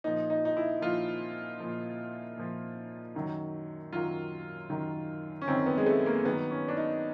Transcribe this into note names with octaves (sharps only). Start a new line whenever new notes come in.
A#2 F3 D#4
D#4
D#4
E4
A#2 F3 F4
A#2 F3
A#2 F3
F#2 D#3 F#3
F#2 D#3 F#3 F4
F#2 D#3 F#3
C#4
F#2 D#3 F#3 C4
B3
G#3
A3
A#3
G2 D#3 F#3 B3
C#4
D4
D#4